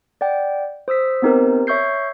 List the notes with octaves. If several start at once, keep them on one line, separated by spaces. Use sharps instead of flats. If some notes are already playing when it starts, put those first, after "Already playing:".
D5 F#5 G5
C5 D#6 E6 B6
B3 C4 D#4 G4 A#4 C5
C#5 E5 C#6 E6 G6 C7